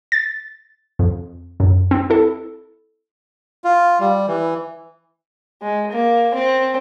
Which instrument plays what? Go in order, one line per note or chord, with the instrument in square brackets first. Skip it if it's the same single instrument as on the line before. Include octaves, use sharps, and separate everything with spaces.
[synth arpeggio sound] A6
F2
F#2
C4
E4 A4
[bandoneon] F4
G3
E3
[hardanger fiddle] G#3
A#3
C4